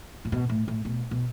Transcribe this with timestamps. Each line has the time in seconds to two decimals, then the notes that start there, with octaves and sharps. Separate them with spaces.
0.25 A#2
0.32 B2
0.49 A2
0.68 A2
0.85 B2
1.11 B2